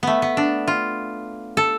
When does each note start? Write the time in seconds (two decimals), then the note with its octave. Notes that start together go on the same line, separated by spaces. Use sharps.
0.03 A3 B3
0.22 B3
0.37 D4
0.68 F4
1.57 A4